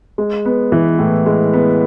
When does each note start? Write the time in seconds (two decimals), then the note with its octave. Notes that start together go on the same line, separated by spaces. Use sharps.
0.18 G#3
0.45 B3
0.72 E3
0.99 A2
1.26 G#3
1.53 B3